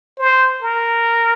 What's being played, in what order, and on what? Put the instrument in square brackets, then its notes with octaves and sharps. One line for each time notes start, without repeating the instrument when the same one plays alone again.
[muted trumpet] C5
A#4